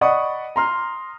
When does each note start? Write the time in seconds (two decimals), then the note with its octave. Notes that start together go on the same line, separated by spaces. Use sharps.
0.01 D5 D#5 F#5 B5 C#6 D#6
0.56 A#5 C6 F6